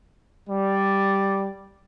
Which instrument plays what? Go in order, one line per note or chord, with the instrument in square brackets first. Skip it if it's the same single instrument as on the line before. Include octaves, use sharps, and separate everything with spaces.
[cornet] G3 [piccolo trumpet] D5